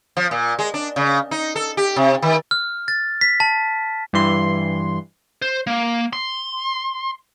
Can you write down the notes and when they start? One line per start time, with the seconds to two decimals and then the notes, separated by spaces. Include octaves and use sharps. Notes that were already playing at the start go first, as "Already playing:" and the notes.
0.17 F3
0.31 A#2
0.59 G#3
0.74 D4
0.96 C#3
1.31 D#4
1.56 A4
1.77 G4
1.96 C3
2.22 D#3
2.51 F6
2.88 A6
3.21 B6
3.40 A5
4.13 G2 E3 C6
5.42 C5
5.67 A#3
6.13 C6